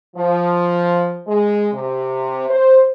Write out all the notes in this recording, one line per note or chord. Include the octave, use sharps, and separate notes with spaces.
F3
G#3
C3
C5